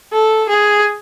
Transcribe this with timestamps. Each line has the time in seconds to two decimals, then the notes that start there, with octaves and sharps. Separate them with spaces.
0.12 A4
0.49 G#4